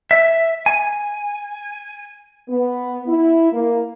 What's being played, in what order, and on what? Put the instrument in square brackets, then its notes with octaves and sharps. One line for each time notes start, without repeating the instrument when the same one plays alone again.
[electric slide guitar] E5
G#5
[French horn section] B3
E4
A#3